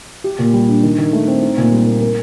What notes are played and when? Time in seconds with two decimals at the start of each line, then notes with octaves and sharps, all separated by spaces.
0.24 G4
0.39 A#2
0.53 G3
0.69 D4
0.83 D#3
0.98 D#3
1.13 A3
1.28 C4
1.43 D#4
1.58 A#2
1.72 G3
1.86 A#3
2.01 A#4